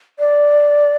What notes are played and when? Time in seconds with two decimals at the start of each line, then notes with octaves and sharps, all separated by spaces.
0.19 D5